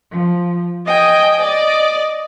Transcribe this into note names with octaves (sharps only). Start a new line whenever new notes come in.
F3
D#5 G5 G#5
D5 D#5